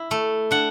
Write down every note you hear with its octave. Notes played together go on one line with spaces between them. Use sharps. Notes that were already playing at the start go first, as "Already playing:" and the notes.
Already playing: E4
A3
D4 F#5